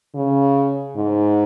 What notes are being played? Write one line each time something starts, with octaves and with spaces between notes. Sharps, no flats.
C#3
G#2